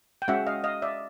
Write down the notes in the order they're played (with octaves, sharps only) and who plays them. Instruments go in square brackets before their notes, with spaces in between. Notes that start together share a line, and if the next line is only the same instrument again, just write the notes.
[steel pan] G5
G#3 C#4 F#4 E5 F#5
D#5 F5
D#5 F5
D5 E5